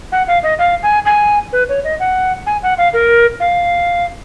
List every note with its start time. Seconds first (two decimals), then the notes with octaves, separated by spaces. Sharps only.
0.12 F#5
0.28 F5
0.43 D#5
0.59 F5
0.83 G#5
1.06 G#5
1.53 B4
1.69 C#5
1.84 D#5
2.00 F#5
2.46 G#5
2.63 F#5
2.78 F5
2.94 A#4
3.40 F5